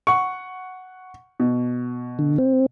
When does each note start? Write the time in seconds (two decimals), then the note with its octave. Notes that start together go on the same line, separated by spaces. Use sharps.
0.07 F#5 C#6
1.40 B2
2.19 D3
2.38 C4